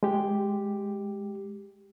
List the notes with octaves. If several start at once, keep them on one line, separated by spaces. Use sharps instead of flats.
G#3 G4